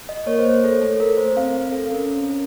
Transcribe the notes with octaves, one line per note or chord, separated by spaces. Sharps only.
D#5
A#3 C#5
C5
C#5
A4
A3 A4
A#4
C5
C4 F5
A4
C#4 A#4